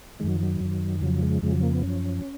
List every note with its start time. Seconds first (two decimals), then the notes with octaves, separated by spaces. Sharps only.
0.20 D#3 G#3
0.24 F#2 F#3
0.36 F3
0.43 F#3
0.60 F#2 D#3
1.02 F2 C#3 F3 F#3
1.23 G#3
1.42 F2 C#3 F3 G#3
1.52 F#3
1.63 A#3
1.73 B3
1.83 F#2 F3 C#4